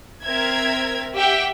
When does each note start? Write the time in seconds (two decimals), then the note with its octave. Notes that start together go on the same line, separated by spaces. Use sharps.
0.24 C4 A#4 E5 G#6
1.16 G4 E5 F#5 G5